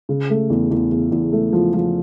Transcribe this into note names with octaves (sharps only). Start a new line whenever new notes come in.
C#3
A3
E2
E2
E2
E2
A3
F3
F3